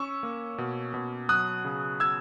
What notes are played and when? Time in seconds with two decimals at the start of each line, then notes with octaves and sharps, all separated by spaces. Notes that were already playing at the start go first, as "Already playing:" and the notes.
Already playing: C#4 C#6 E6
0.23 A#3
0.58 B2
0.94 B2
1.29 F#3 D#6 F#6
1.65 C#3
2.00 E6 G#6